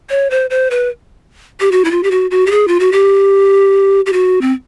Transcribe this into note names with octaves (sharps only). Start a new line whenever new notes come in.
C#5
C5
C5
B4
G4
F#4
E4
F4
G4
F#4
F#4
G4
G#4
F4
F#4
G4
G4
F#4
C4